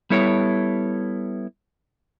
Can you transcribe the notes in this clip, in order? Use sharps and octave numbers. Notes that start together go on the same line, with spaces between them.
G3 B3 E4 A4 C#5